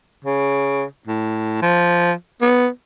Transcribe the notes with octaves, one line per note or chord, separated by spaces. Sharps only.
C#3
A2
F3
B3